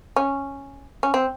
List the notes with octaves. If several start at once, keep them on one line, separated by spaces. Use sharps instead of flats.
C#4
C#4
C4